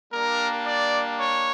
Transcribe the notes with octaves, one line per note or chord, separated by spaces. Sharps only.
G3 A#3 D4 A#4
D5
C#5